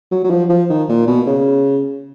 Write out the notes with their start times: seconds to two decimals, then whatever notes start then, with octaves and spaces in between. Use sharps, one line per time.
0.11 F#3
0.24 F#3
0.30 F3
0.49 F3
0.70 D#3
0.89 A#2
1.07 B2
1.27 C#3